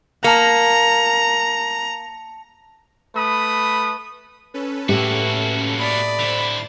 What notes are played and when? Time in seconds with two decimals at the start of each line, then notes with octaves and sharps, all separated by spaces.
0.24 A#3 A5 A#5 C#7
3.15 A3 B4 B5 D#6
4.54 C#4 A4 B4
4.89 A2 A#3 F#4 G4 E5
5.79 D5 B5 D#6
6.20 D3 E4 C5 A6